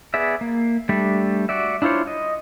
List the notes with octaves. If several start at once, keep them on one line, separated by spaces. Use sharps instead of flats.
B3 G#4 D5 E5
A#3
G3 A3 D4 D5 E5
F#4 D5 E5
D4 E4 F4 C5 C#5
D#5